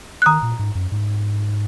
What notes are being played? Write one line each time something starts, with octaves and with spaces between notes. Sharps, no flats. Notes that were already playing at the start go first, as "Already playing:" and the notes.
F#6
D#3 A#5 D#6
A#2
G#2
F#2
G#2